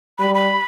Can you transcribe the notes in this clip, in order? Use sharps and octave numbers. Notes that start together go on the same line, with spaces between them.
G3 B5
B5